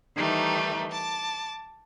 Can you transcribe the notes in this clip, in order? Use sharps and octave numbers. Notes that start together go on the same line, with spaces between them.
D#3 E3 G3 A3 D#4
A5 D6